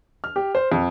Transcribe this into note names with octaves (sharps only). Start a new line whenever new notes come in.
F6
G4
C5
F2